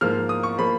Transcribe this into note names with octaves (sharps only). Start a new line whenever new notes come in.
G#2 F3 A#3 F6
D#6
C#6
F3 A#3 B5